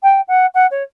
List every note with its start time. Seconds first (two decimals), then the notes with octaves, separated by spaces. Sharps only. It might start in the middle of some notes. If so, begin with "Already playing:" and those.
0.03 G5
0.28 F#5
0.55 F#5
0.71 C#5